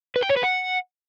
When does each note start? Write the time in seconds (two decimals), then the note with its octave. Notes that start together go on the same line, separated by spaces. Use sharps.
0.16 B4
0.23 G5
0.29 C#5
0.36 B4
0.43 F#5